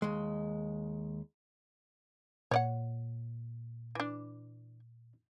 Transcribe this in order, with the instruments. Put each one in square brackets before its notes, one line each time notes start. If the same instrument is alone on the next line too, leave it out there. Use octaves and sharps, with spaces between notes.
[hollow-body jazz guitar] D#2 G#3
[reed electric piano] A#2 [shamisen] C#5 D5 F#5
[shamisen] E3 D4